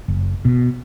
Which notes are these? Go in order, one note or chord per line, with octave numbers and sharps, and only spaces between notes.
F#1
B2